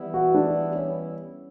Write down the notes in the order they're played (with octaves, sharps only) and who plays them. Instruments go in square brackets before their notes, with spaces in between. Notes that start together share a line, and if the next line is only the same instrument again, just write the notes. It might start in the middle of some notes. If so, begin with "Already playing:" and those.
Already playing: [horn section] E3 G3 B3 E4
[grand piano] F#4
D4
C#4